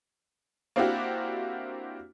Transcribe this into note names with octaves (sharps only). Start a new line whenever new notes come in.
A#3 C4 D4 E4 F#4 G4